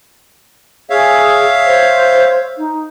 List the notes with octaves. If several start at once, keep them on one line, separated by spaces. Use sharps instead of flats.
G#4 C#5 E5 F5
C5
D#4